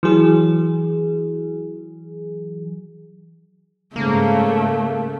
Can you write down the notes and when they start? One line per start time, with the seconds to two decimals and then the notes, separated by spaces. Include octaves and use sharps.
0.03 E3 F#3 G#4
3.96 G#2 C#3 A3 A#3